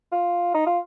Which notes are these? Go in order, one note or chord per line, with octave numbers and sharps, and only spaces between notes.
F4
D#4
F4